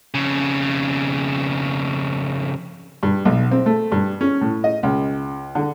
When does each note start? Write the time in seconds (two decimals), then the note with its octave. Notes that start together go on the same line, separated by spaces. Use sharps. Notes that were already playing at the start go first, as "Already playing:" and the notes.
0.14 F2 C#3
3.03 G2
3.25 B1
3.51 C4
3.66 A3
3.92 G2
4.21 C#4
4.41 A2
4.64 D#5
4.83 C#2
5.55 D3